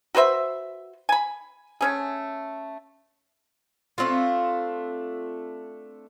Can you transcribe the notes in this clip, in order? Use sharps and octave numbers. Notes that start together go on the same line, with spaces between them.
F#4 B4 C5 E5
G#5 B5
A3 C#4 G#4
A3 C4 D4 F4